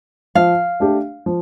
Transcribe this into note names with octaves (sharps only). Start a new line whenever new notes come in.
F3 F5
A3 D4 G4
F3